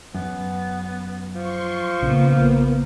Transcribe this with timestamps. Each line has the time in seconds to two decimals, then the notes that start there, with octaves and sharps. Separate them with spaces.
0.15 F#2 B3
1.35 F3 C6 C#6
2.02 A#1 C#3 A#3 B3